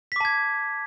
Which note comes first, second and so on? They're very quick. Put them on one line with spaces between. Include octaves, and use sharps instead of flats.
B6 D6 A5 G#6